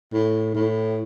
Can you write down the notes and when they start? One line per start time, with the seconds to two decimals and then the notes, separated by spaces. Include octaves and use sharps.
0.13 A2
0.55 A2